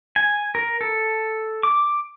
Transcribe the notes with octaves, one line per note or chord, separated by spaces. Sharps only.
G#5
A#4
A4
D6